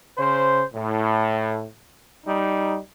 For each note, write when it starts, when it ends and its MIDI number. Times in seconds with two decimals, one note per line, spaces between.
0.18 0.63 49
0.18 0.63 72
0.73 1.66 45
2.26 2.77 55
2.26 2.77 63